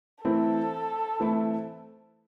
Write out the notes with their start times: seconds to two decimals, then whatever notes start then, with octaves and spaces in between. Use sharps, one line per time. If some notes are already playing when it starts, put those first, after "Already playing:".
0.24 E3 A3 C4 E4 A4
1.20 E3 A3 C4 E4